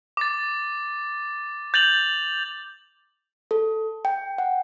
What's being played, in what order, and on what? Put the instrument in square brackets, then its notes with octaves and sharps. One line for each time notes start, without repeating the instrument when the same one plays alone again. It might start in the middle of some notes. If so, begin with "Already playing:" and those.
[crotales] D6 A6
G6 A6 F7 F#7
[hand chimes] A4
G5
F#5